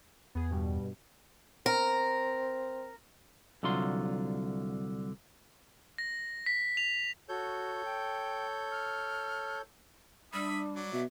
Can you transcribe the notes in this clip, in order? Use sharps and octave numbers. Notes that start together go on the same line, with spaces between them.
E2 B3 G#4
G2 B2 G3
C4 A#4
C2 D3 F#3 F4 C6
A#6
B6
F7
F#4 A4 C#5 G6
G5
F6
G3 D4 E5 B5 D#6
F#3 D5
B2 B3 E5